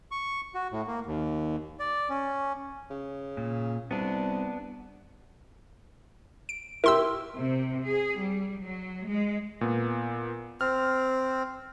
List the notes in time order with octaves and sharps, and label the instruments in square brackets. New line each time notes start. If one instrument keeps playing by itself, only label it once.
[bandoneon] C#6
F#4
A2
A#3
D#2
D5
C#4
[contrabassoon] C#3
[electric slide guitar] A#2
[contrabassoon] C2 [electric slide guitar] B3 D4
[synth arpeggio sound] D7
[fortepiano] E4 G4 [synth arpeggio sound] A#4 C6 E6
[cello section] C3
G#4
G3
F#3
G#3
[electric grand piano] A#2 B3
[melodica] C4 [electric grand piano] F6